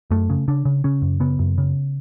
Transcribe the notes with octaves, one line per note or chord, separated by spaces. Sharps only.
F#2 A3
C#3
C#3 D4
C#3
C#3 C#4
F#2
C#3 B3
F#2
C#3